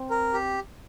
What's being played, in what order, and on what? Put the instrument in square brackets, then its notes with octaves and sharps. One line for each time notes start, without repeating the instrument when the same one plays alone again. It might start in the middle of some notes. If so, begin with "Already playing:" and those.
Already playing: [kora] C4
[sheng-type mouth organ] A#4
G4